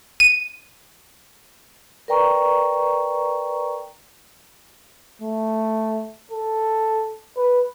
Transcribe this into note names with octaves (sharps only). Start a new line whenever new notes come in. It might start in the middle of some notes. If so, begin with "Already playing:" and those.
D#7
A#4 B4 D5 G5 A#5 C#6
A3
A4
B4